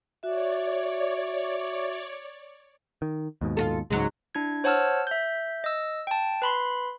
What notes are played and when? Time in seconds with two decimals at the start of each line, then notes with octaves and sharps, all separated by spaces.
0.23 F#4 C#5 D5 E5
3.02 D#3
3.41 D#2 G#2 B2
3.57 F4 F#4 A4
3.90 C#2 G#2 F#3 G#3
4.35 D4 E4 G#6
4.64 C5 C#5 F#5 A5 E6 F6
5.07 E5 G6
5.64 D#5 E6
6.07 G5 A5
6.42 B4 B5 C6